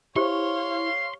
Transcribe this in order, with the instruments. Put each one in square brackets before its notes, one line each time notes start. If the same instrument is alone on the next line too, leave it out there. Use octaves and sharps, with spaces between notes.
[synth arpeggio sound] E4 [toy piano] G4 C5 [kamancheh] C#5 F5 [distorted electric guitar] C6